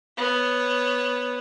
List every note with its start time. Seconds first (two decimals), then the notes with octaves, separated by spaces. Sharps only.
0.17 B3 C#5